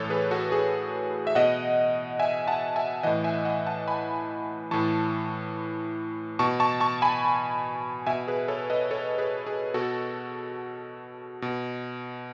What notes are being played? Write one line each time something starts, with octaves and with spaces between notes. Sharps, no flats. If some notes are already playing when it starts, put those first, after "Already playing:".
Already playing: A2 E3 A4 C#5
G#4 B4
F#4 A4
G#4
E5
B2 D#5 F#5
E5 G#5
F#5 A5
E5 G#5
A2 E3 D#5 F#5
E5 G#5
D#5 F#5
F#5 A5
G#5 B5
A2 E3 A5 C#6
B2 A5 C#6
A5 C#6
A5 C#6
G#5 B5
B2 E5 G#5
G#4 B4
A4 C#5
B4 D#5
A4 C#5
G#4 B4
G#4
B2 F#4 A4
B2